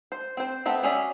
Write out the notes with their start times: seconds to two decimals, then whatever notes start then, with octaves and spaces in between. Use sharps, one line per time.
0.12 C5
0.37 C4 C5
0.66 A3 B3 C4
0.83 F#3 C#4 G#4 D5 E5